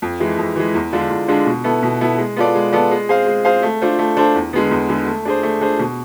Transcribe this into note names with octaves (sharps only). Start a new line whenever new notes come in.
F2
E3 G#3
F2
E3 G#3
E2
D3 G#3 D4 F4
E2
D3 G#3 D4 F4
B2
B3 E4 A4
B2
B3 E4 A4
G#3
B3 F4 A4 D5
G#3
B3 F4 A4 D5
G#3
C4 G#4 C5 F5
G#3
C4 G#4 C5 F5
A3
D4 F4 A4 C5
A3
D4 F4 A4 C5
E2
D3 G#3 B3
E2
D3 G#3 B3
A3
D4 G#4 C5
A3
D4 G#4 C5
B2